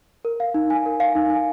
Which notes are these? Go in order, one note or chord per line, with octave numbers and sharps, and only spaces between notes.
A#4
F5
D#4
G#5
A#4
F5
D#4
G#5